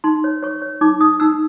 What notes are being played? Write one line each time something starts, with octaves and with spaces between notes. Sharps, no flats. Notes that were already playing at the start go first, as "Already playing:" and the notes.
D#4 C6
C#5
C#5 C#6
C#5
D#4 D6
D#4 D#6
D#4 E6